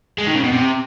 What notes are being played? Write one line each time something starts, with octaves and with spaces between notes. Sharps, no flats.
G#3
D#3
C#3
B2
C3